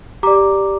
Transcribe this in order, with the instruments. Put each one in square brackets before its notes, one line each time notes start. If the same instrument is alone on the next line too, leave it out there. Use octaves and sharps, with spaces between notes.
[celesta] G4 D5 A#5 D6